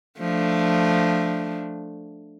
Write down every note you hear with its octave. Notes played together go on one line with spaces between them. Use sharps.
F3 A3 D4